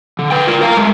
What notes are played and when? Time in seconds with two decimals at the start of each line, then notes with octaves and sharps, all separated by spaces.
0.19 D3
0.31 B4 G5
0.47 F4 A#4
0.61 A#4 F5 A5 A#5
0.77 G#3 A3